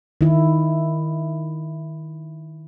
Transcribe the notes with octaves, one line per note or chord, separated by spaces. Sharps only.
D#3 E4